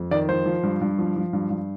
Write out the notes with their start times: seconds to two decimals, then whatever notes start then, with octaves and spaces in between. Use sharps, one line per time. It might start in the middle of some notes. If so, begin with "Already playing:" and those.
Already playing: F2
0.11 D#3 D5
0.29 F3 C5
0.46 F3
0.63 G2
0.81 G2
0.99 F3
1.16 F3
1.33 G2
1.50 G2